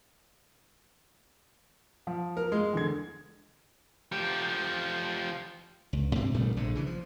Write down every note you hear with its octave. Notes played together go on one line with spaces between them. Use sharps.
F3
A#4
G#3
E2 D3 G#6
F3 G4
C#2
G#2 C3 C4
A1 A#2 G3 A3
A#1 G#2 D3
C#3 E3
F3